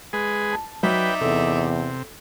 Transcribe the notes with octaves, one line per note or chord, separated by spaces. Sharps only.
G#3 G#4 B4
A5
F#3 D#4 B4 D5 E5 G5
E2 C3 A4